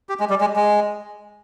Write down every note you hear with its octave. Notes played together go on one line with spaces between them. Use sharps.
G4
G#3
G3
G#3
G#3